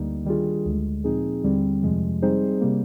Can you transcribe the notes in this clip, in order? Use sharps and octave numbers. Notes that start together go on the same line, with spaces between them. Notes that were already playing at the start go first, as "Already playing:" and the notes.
Already playing: D2 D3 G3 A#3 D#4
D#3 G3 D4 F4 G#4
D2 D3 G#3
A#2 F3 C4 D#4 G#4
D#2 D3 G3 C4
F2 C3 F3 G#3
G3 C4 D#4 G#4 C5
C3 G3 A#3